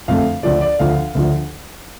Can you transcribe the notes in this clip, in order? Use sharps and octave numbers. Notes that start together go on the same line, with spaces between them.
F2 D3 A3 F5
D2 D3 F3 D5
D5
D2 D3 F3 F5
D2 D3 F3